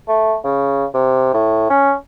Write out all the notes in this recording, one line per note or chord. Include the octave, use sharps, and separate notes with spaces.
A3
C#3
C3
A2
C#4